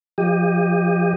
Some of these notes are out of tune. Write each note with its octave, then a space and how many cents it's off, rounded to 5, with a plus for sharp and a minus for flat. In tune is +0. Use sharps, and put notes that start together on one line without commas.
F3 +0 G4 +25 D#5 +0